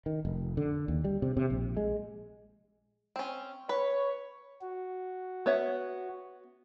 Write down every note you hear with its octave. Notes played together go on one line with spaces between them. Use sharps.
D#3
F1
D3
D#2
G3
C3
C3
A#1
G#3
C4 C#4
B4 C#5
F#4
B3 C#5 E5